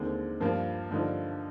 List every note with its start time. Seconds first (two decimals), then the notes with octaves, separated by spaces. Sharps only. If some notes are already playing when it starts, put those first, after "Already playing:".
Already playing: D#2 D3 G#3 C4 D#4
0.40 G2 F3 A#3 F4
0.91 G2 D3 F3 A#3 D4 D#4